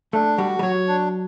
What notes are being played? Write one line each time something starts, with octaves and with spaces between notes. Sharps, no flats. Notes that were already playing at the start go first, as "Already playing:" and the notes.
A3 D4
G3 F#4
G3
F#3 C#5
D4